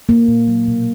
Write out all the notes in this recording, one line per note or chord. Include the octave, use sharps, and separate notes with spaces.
A#3
A#2
F#3
B2